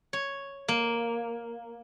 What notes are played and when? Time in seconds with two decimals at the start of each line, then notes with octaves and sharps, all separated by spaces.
0.13 C#5
0.68 A#3